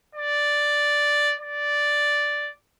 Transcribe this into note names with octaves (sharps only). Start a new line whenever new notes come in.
D5
D5